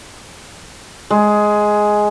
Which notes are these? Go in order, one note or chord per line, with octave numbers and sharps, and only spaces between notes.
G#3